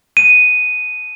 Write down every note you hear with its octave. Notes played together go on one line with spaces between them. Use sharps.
D#7